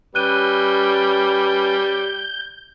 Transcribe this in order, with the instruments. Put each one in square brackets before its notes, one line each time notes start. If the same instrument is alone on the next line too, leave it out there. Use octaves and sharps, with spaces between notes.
[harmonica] G3 [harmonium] C#4 B4 [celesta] F#6 D#7 [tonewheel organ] G6